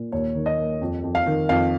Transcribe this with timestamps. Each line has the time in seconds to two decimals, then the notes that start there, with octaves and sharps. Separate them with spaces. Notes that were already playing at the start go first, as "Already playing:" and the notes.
Already playing: A#2
0.12 D#2 C#5
0.35 D#3
0.46 D#5
0.58 A#3
0.81 F2
1.03 F2
1.15 F5
1.26 D#3
1.49 F2 F5